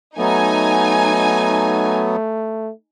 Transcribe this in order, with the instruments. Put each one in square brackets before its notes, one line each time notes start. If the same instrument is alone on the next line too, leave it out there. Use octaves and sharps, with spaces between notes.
[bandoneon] F#3 B3 [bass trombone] A3 [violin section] D#4 G#5